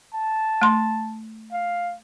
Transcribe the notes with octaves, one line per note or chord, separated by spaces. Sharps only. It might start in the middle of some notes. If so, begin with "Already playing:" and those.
A5
A3 C6
F5